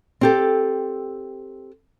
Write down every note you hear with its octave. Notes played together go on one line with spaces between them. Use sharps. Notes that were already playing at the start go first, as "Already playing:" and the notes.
C4 G4 A4